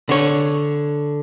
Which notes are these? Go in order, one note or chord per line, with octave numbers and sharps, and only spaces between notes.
D3 C#5